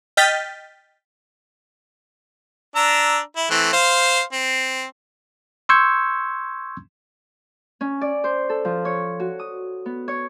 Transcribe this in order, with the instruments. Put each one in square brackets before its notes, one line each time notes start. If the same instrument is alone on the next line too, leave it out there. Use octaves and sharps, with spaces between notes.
[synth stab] D#5 G5 F6 G6 A6 B6
[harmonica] D4 A#5 E6
E4
E3 A3 C4
C5 F5
C4
[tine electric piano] C6 C#6 E6 G6 G#6 C#7
[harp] C#4
D5
C5
A4
F3
C#5
F#4
D#6
B3
C#5